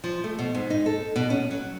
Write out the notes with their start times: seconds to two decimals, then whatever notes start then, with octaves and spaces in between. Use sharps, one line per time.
0.04 F3
0.24 A3
0.39 B2
0.55 G#2
0.70 D#4
0.86 A4
1.16 B2
1.30 C#4
1.51 F#3